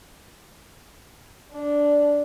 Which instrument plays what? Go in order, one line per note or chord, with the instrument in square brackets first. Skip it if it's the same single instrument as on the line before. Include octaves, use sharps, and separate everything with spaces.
[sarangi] D4